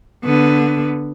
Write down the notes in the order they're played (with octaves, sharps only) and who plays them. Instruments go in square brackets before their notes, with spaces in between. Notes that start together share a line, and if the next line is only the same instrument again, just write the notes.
[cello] D3 B3